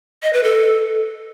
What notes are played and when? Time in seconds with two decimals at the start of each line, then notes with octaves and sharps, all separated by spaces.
0.23 D#5
0.33 B4
0.44 A4